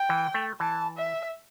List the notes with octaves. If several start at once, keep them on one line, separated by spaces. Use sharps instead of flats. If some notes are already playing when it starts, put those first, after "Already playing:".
Already playing: G5
E3
A3
E3 A5
E5